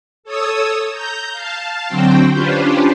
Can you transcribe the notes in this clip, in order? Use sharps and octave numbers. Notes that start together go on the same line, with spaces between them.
A4 C#5 D#6 E6
A#5 G6
F5 A5
D3 F#3 C4 F#4 C5 G5
C#4 D4 F4 G4 B4 C5